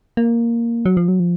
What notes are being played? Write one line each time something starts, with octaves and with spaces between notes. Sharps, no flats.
A#3
F#3
F3
F#3
F3